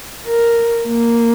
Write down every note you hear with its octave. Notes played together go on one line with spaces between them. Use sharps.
A#4
A#3